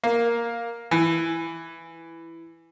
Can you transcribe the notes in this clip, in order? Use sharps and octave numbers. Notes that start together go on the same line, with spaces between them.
A#3
E3